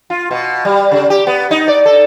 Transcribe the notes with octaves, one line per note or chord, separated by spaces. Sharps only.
F4
B2
G3
C#3
G4
B3
D#4
D5
A4